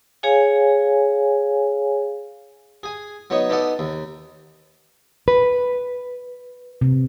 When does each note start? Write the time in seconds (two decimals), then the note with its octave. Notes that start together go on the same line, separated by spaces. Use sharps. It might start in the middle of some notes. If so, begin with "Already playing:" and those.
0.23 G#4 C#5 F5 G#5
2.83 G#4 G#5
3.30 F#3 B3 D#4 C#5
3.50 B3 D#4 A4 D5 F#5
3.79 D#2
5.28 B4
6.81 C3